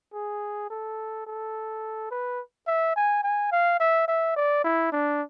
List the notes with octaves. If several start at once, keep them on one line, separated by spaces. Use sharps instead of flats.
G#4
A4
A4
B4
E5
G#5
G#5
F5
E5
E5
D5
E4
D4